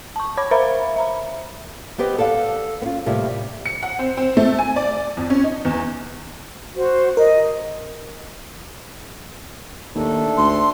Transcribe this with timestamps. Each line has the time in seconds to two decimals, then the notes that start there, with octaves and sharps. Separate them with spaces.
0.16 A5 C#6
0.37 C#5 B5 D6 G#6
0.51 A#4 C5 E5 F5 A#5 B5
0.96 E5 A#5 B5
1.98 B3 C4 G4 B4 D#5
2.18 A4 D5 F5 F#5
2.82 B3 C#4 F4
3.06 A2 C3 G3 A#3 F4
3.66 C#7
3.83 F#5
3.99 C4
4.17 C4
4.37 A3
4.59 G#5
4.76 D5
5.17 F2
5.30 C#4
5.44 D#4
5.65 E2
6.75 F#4 C5
7.17 A#4 D#5
9.95 D#2 A3 D4 A4
10.37 D2 C6